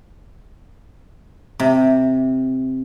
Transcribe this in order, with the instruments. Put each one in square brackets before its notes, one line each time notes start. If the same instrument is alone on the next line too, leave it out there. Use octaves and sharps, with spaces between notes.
[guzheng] C3